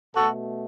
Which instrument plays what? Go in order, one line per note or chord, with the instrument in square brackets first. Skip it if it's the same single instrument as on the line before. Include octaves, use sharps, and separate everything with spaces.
[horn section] B2 A3 F#4 A4